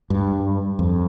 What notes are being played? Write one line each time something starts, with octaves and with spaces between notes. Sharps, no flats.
G2
F2